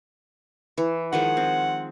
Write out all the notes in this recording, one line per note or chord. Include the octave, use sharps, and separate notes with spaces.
E3
D#3 F3 G#3 F#5
C4